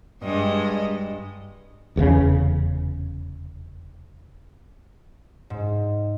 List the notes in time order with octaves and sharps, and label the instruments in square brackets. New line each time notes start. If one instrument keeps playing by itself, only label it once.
[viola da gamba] G2 G#3 D#5
[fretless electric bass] F1 E2 G#2 C#3
[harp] G#2